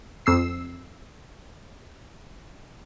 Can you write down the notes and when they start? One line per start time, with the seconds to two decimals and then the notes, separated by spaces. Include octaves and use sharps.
0.26 F2 E6 C7